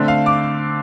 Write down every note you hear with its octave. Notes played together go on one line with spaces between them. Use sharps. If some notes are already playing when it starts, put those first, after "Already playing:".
Already playing: D3 A3 C4
F5
D6